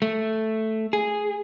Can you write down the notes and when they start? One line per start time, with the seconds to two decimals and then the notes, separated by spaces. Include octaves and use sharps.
0.02 A3
0.93 G#4